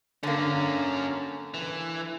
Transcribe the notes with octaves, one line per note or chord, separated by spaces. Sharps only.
D3 A#3 C#4 A#4
E3